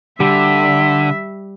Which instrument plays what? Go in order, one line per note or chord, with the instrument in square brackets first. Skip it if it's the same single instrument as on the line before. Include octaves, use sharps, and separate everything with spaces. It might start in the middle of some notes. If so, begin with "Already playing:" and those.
[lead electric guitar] D3 [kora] G3 [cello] E5